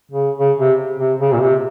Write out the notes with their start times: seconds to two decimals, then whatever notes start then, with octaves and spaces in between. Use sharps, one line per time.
0.11 C#3
0.38 C#3
0.59 C3
0.99 C3
1.20 C#3
1.33 A#2
1.40 C3